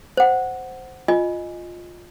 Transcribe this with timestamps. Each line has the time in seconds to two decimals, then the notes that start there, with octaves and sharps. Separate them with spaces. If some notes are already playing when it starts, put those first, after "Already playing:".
0.17 C5 F#5
1.08 F4 D#5 G#5